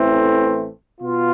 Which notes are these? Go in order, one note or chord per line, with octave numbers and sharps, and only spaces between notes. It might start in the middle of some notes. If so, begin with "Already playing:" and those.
Already playing: A1 A2 E3 A3 C4
B2 B3 F4